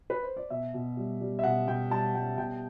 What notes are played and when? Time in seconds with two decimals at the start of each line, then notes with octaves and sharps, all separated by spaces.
0.10 B4
0.23 C5
0.37 D5
0.50 B2 E5
0.74 B2
0.97 G3
1.21 G3
1.39 E5
1.44 B2 F#5
1.67 B2 G5
1.90 G3 A5
2.15 G3 G5
2.37 B2 G5